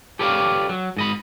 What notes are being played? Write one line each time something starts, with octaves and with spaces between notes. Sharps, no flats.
G4 A4 B4 C#5 D5 F5
F#3
G#2 D#5 B5